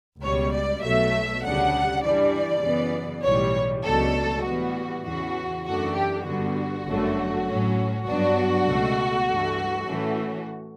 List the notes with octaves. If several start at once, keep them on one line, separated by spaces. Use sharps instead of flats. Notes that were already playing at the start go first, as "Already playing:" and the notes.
C#2 B2 G3 C#5
D5
B1 B2 F#3 A3 E5
D2 C#3 G3 D4 F#5
G2 E3 G3 D4 D5
F#2 C#3 E3 B3
B1 A2 E3 G3 C#5
C#2 B2 F#3 A3 D4 A4
A2 E3 G3 B3 F#4
E2 C#3 E3 F#4
F#2 E3 A3 D4 F#4
G4
G2 D3 G3 B3 F#4
G1 F#2 D3 F#3 A3
A2 F#3 C#4
G2 F#3 B3 D4 F#4
C#2 B2 A3
G2 E3 A3
A2 E3 A3 C#4